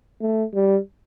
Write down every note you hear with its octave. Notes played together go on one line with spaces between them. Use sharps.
A3
G3